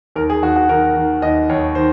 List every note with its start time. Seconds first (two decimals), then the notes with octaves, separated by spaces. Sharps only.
0.16 D#2 A#4
0.30 G#4
0.42 D#2 F#4
0.56 F#4
0.69 D#3 A#4
0.96 D#3
1.22 D#2 D#5
1.49 D#2 C#5
1.75 D#3 C5